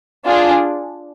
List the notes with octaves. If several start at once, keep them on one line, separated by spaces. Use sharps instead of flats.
D4 F4 G#4